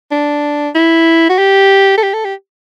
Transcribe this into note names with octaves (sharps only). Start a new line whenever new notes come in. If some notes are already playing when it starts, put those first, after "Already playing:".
D4
E4
F#4
G4
A4
G4
A4
G4